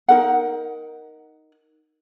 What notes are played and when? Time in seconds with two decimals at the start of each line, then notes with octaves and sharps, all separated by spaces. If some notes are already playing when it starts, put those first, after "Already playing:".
0.08 D#4 A#4 F#5